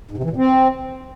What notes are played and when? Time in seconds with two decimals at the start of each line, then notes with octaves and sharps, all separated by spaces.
0.11 G#2
0.17 C3
0.24 E3
0.30 A#2
0.36 C4